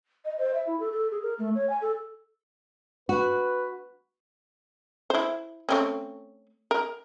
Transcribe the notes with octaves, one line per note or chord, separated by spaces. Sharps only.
D#5
C5
E5
E4
A4
A4
G#4
A#4
A3
C#5
G#5
A4
F#4 B4
E4 C5
A3 C4 C#4
A#4